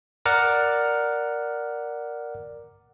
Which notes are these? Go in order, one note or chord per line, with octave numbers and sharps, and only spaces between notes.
A#4 D5 F#5 A#5 F6